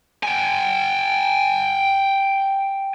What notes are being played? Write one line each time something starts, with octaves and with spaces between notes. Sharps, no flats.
G5 G#5